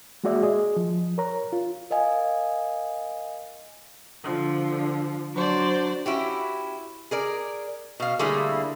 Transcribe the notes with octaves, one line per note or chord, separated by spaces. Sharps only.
G#3 A#3 F#4 G#4 D5 E5
G#4 D#5
F3
A#4 C#5 A#5
F4
A#4 D#5 F5 G#5
D3 F3
F#3 D4 F#4 C5 D5
C#4 E4 F#4 G4
G#4 A#4 D5
B2 F5
D3 G3 A3 A#3 E4 G#4